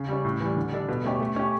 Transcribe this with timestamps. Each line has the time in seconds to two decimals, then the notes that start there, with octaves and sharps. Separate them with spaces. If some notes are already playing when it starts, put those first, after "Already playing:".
Already playing: C#3
0.08 G3 C#4
0.25 A2
0.40 E3 G3
0.57 D3
0.72 G3 D4 A4
0.88 B2
1.04 A3 C#4 G4 C#5
1.20 A3
1.36 C#4 G4